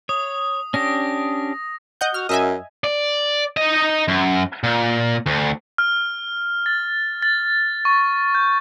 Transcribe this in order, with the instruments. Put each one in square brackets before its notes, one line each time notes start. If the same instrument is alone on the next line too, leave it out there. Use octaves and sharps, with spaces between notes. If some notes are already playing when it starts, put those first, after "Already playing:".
[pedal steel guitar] C#5 [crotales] D#6
[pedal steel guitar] C#4 D4 G4 [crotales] A#6
[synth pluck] D#5 F#5 G6
[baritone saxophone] F#4 [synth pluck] F6
[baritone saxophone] F#2 [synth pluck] D#5 E5 G#5
[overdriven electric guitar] D5
D#4 D#5
F#2
A#2
D2
[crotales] F6
A6
A6
C#6
G6